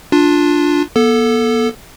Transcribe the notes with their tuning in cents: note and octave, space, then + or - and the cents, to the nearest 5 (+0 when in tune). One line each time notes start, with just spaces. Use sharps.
D4 +0 F4 +15
B3 -40 A4 +0